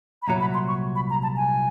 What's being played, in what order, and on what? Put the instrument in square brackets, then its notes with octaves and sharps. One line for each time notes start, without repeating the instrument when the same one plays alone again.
[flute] B5
[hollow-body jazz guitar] C2 A#2 F#3 [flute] A#5
[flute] B5
C6
C#6
B5
A#5
A5
G#5